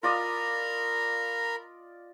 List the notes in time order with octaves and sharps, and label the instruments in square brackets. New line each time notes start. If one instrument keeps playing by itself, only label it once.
[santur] F4 D5 D#5 [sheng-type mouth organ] A#4 A#5 B5